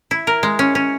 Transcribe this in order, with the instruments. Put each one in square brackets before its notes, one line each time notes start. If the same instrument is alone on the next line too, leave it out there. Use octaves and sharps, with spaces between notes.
[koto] E4
A#4
G#3
C#4
C#4